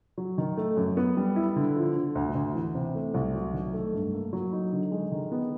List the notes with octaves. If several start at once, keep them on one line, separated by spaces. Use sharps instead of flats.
F#3
D#3
A3
F#2
B3
G3
E4
D3
F3
D3
D2
D2
E3
C3
A3
C2
F#3
D#3
A3
G2
A#3
F#3
D#4
D3
G#3
D#3
B3